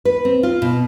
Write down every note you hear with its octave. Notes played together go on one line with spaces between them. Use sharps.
B4
C4
F4
B2